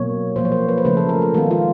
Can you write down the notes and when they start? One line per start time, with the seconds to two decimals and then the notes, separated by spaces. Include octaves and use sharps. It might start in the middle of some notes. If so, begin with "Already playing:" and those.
Already playing: B2 F#3 A#3 C#5
0.36 A#2 F3 A#3 C5
0.45 C#5
0.52 C5
0.68 B4
0.78 C5
0.85 C#3 F3 A3 B4
0.97 A4
1.09 A#4
1.22 A4
1.34 D#3 G#3 B3 F4
1.51 F4